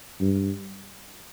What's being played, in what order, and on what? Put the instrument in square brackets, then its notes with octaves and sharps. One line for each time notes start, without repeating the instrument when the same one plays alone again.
[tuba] G2